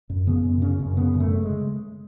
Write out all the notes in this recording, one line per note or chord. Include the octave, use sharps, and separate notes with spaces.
F#2
C#3 B3
F#2
C#3 C#4
F#2
C#3 B3
F#2
A3
C#3
G#3